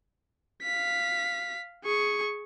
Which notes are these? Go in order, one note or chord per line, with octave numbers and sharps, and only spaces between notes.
F5 B6
G#4 C#6